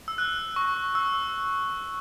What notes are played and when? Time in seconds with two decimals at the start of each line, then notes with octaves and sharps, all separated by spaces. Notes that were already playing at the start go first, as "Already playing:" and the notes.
0.08 E6
0.18 F#6
0.56 C#6
0.95 E6